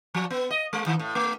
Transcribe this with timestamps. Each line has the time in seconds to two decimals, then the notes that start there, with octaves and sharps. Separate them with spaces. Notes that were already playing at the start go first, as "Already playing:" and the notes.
0.14 F3
0.30 B3
0.51 D#5
0.73 G#3
0.86 D#3
0.99 A2
1.15 A3